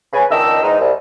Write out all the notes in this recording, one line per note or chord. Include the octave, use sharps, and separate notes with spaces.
C#3 B4 G#5
C#2 D#3 D4 D#5 E6
E2 G#2 G#3 D#4
C2